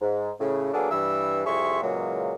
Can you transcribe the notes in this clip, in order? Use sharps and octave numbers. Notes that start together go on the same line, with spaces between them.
G#2
A2 C#3
F#3 A#3 B3 D4 G#4 A4
G2 E3 E6
C2 F2 G#4 E5 C6 C#6
A#2 C#3 E3 F#3 G#3 A#3